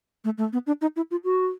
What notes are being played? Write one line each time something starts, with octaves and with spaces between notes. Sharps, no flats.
A3
A3
B3
D4
D#4
E4
F4
F#4